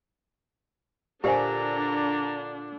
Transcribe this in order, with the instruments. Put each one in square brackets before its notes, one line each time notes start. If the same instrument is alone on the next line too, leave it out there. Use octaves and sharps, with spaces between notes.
[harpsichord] A#2 [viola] D3 D4 [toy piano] G4 C5 G#5 [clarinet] A#5